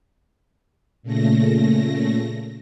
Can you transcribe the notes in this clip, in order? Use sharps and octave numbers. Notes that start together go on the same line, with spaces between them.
A#2 C#3 A3 A#6